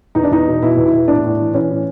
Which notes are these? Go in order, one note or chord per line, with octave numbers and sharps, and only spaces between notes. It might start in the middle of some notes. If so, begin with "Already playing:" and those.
E2 D#4
D4
E2 D#4
B2
B2 E4
E2
E4
E2
A2 D4
A2
E3
E3 C#4
A2